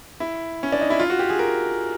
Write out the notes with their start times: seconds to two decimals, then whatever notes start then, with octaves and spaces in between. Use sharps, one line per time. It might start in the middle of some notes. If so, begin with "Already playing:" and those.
0.20 E4
0.63 C#4
0.72 D4
0.81 D#4
0.90 E4
1.00 F4
1.10 F#4
1.19 G4
1.29 G#4
1.39 A#4